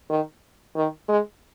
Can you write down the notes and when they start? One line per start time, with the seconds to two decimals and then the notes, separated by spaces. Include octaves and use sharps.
0.10 D#3
0.76 D#3
1.09 G#3